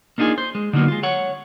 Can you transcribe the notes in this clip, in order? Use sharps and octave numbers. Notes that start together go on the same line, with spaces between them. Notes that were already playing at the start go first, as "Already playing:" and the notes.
A#3 D4 D#4 F4 G#4
C5
G#3
D3 D#3 F#3 A#3 B3
G#3 F4
C#5 F#5